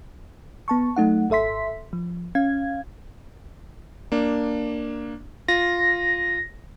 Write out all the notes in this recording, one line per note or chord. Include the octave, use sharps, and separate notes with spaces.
B3 A5 C#6
F#3 A3 D#4 F#5
G#1 A4 E5 C6 B6
F3
C#4 F5 G#6
A#3 D4
F4 A#6